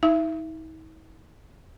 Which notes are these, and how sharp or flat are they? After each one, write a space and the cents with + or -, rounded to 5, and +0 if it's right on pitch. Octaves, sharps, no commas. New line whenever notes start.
D#4 +45 E5 +25